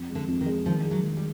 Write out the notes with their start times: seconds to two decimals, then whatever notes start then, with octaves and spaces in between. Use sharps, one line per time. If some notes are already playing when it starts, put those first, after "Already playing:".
Already playing: F2
0.09 G#3
0.15 D3
0.28 F2
0.41 D#3
0.46 G#3
0.66 D#3 F3
0.85 G#3
0.91 F#3
1.03 D#3
1.17 G3